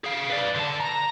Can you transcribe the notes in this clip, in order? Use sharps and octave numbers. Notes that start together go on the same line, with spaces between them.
G#4 F5
B4 D5
D3 A5
A#5